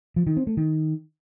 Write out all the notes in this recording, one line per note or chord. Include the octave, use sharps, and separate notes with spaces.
F3
D#3
C4
A3
D#3